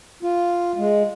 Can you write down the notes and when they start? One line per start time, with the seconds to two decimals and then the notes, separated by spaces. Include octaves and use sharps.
0.23 F4
0.78 G#3